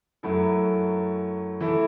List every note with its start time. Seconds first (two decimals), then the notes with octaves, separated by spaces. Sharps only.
0.23 F#2 F#3 A3 E4 A4
1.61 E3 A3 E4 A4